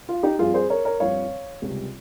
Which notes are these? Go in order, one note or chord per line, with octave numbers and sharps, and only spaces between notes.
F4
D#4 G4
G2 F3 C4 F4 G#4
G#4 C5
A#4 C#5
A#4 C#5
G2 F3 C4 C#5 F5
C#2 C3 G3